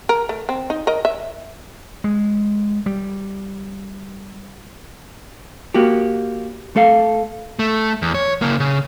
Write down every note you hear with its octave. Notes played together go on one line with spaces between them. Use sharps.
A#4
A3
C4
D#4
A#4 D#5
E5
G#3
G3
A#3 F#4 G4
A3 A4 F5
A3
E2
C#5
C#3 A#3
C#3